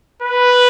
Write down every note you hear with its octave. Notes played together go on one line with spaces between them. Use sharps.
B4